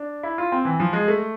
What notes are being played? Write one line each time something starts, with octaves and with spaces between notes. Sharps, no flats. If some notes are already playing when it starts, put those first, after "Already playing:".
Already playing: D4
E4
F4
C4
E3
F3
G#3
A3